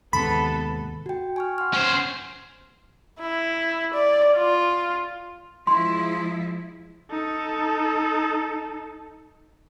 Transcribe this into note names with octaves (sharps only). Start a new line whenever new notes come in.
D#2 G#2 C3 B3 A4 B5
F#4 G5
G#5 C#6 F6
F#5 C6 F6
C#4 C5
E4
D5
F4
F3 G#3 E4 C6
D#4 A4